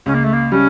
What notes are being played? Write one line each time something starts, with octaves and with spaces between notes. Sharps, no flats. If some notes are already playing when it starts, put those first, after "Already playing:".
C#2 C#4
A#3
A3
A#3
G3 C#4